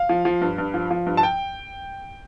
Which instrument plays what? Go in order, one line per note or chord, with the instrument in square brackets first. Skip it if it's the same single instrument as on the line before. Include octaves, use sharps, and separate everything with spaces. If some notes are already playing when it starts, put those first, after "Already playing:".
Already playing: [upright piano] F5
F3
F3
G2
G2
F3
F3
G2
A5
G5